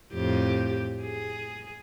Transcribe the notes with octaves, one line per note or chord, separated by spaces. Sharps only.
F2 A2 G4
G#4